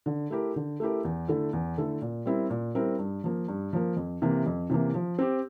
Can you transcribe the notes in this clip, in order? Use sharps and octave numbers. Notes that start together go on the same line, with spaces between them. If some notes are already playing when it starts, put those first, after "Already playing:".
D3
A3 E4 G4 A#4
D3
A3 E4 G4 A#4
E2
D3 A3 E4 A4
E2
D3 A3 E4 A4
A#2
G3 C4 E4 A#4
A#2
G3 C4 E4 A#4
G2
F3 A#3
G2
F3 A#3
F2
C3 E3 A#3
F2
C3 E3 A#3
F3
C4 G4